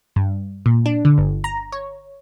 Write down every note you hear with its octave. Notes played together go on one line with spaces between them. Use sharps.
G2
A#2
D4
D3
G1
A#5
C#5